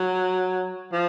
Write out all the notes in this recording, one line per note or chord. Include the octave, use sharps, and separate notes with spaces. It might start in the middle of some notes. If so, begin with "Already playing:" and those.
Already playing: F#3
F3